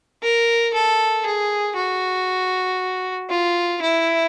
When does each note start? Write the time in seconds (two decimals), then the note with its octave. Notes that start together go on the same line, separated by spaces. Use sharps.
0.23 A#4
0.74 A4
1.26 G#4
1.76 F#4
3.30 F4
3.82 E4